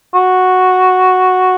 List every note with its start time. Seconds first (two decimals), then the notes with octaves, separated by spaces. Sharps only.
0.14 F#4